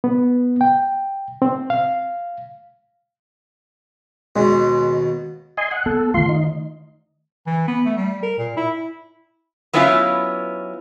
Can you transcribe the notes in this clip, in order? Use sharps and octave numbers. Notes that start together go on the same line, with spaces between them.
B3
G5
C4
F5
D#2 B2 G#3
D#5 G#5 C6
F#5
B3 A4
D#3 A3 F4 C6
D#4
E3
B3
A3
G3
A#4
A#2
E4
F#3 B3 C#4 E4 F4 F5